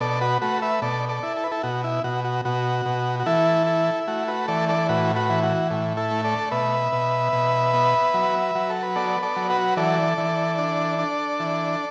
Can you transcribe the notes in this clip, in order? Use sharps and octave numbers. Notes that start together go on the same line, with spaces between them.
B2 A4 D5
F#4 B4
A3 F#4 B4
B4 E5
B2 A4 D5
A4 D5
E4
A4
B4
E4 A4
B2 F#4
E4
B2 F#4
F#4
B2 F#4
B2
F#4
E3 E4 A4
E4
A3 F#4
F#4 B4
E3 A4 D5
A4 D5
A2 F#4 B4
F#4 B4
E3
F#4
A2
E4 A4
A3
A4 D5
B2 B4 E5
B2
B2
B3
F#3
F#3
A4
B4
B3 A4 D5
A4 D5
F#3
F#4 B4
E3 A4 D5
E3
D4
D4
E3